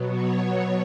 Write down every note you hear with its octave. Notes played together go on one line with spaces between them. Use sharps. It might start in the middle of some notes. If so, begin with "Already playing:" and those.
Already playing: B2 F#3 B3
C#5